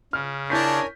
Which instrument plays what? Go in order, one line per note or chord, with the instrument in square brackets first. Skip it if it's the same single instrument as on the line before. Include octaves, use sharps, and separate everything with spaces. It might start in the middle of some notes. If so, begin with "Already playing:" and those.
[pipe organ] C#3 [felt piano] F6
[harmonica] D4 A5 [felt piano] E4 G6 B6 [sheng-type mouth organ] A#4 C#5 G#5